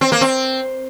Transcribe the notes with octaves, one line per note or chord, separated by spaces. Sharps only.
C4
A#3
C4